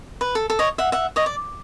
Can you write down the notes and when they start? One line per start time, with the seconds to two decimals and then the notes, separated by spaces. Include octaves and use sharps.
0.21 B4
0.35 A4
0.50 A4
0.59 C#5 D#5
0.78 E5 F#5
0.92 E5 F#5
1.16 C#5 D#5
1.26 D5